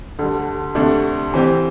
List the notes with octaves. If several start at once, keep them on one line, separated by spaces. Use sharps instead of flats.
D2 D3 G3
D2 C3 A3 D4
C3 E3 C4 G4